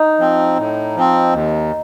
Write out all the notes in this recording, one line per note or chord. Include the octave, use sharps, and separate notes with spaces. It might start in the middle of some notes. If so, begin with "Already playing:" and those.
Already playing: D#4
F3 C4
A2
F3 C4
D#2